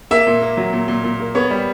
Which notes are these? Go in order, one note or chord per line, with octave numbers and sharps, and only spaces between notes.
A#3 E5
A#2
A#3
F#3
A#2
A#2
A#2
A#3
B3 C#5
G3